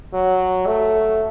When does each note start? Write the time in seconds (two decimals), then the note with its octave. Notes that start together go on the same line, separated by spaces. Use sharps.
0.14 F#3
0.67 A3